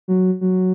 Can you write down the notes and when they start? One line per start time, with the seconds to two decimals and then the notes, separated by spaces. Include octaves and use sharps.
0.08 F#3
0.41 F#3